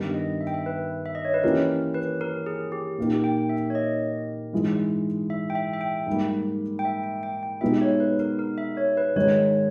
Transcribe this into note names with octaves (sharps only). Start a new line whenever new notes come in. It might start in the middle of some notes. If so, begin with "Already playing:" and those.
Already playing: G2 D#3 G3 B3 G4
D#5
E5
G5
E5
B4
E5
D#5
C#5
B4
E3 A#3 C#4 E4 G4 A#4
B4
A#4
G#4
G4
A#2 A#3 D#4 G4
G5
E5
C#5
D#5
G#2 E3 G#3
E5
G5
E5
E5
G5
G#2 G3 A#3
G5
E5
G5
G5
G5
B2 G#3 B3 D#4 G4 E5
C#5
B4
A#4
A#4
E5
C#5
B4
G#2 D#3 G#3 D#4 C#5